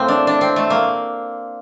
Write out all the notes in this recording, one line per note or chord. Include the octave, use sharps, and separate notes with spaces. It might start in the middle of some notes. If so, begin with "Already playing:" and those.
Already playing: A2 A3 A#3 C4
D4
D4
C4
A3
A#3